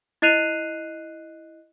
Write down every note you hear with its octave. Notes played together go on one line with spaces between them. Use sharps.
E4 D#5 F#6 C7 D#7 F7